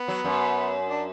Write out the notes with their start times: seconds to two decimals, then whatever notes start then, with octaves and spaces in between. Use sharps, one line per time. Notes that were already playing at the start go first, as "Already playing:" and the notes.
Already playing: B3
0.08 F#3
0.25 F#2
0.89 D4